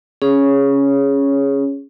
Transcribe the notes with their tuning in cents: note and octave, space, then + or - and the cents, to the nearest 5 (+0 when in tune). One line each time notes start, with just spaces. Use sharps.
C#4 +0 G#4 +0 C#5 +0